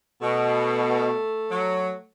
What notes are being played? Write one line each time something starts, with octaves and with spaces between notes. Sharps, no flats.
B2 A3
F#3